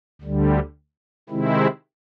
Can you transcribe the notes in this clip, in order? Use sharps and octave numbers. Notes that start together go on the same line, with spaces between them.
D2 D3 G3
C3 D#3 G#3 C4 E4